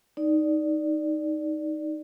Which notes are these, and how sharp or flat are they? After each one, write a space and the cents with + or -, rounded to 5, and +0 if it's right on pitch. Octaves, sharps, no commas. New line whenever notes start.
D#4 +0 D5 +0